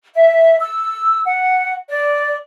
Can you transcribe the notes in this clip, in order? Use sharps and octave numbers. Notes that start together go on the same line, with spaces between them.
E5
E6
F#5
D5